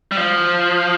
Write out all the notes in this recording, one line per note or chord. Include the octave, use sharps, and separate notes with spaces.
G3
F3